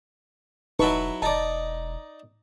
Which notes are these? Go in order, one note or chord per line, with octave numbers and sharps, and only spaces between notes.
E1 F#3 D#4 E4 B4 A5 C#6
E1 D#4 D5 A5